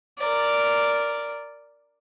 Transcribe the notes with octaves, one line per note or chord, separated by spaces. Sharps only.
A#4 D5